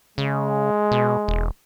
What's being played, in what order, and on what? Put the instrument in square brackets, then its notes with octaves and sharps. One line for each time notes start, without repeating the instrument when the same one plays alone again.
[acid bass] C#3 [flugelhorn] G#3
[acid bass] B2
E1